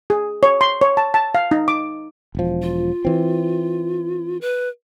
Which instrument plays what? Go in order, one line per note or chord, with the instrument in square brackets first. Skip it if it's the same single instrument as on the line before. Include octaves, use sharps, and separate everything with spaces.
[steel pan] G#4
C#5
C6
C#5
A5
A5
F5
D#4
D6
[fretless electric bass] E1 F3
[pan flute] F4
[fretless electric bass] E3 C4
[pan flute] B4